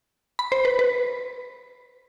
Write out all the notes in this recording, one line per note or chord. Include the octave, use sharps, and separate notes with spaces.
B5
C5
B4
B4